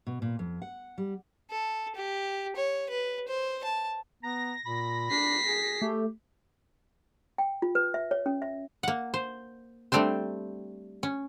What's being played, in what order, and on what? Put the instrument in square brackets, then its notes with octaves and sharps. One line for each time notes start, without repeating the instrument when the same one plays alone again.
[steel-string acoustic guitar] B2
A#2
F2
F#5
G3
[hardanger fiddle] A4
G4
C#5
B4
C5
A5
[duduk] B3 [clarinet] A#5 [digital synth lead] A#6
[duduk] A#2 [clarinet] B5
[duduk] D4 [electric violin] B6 C7
[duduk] G#4
[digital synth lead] A3 [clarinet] G4
[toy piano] G5
F4
B4
E5
C#5
C#4
E5
[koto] A#3 F#5
C5
G3 A3 C4 D4 C5
C#4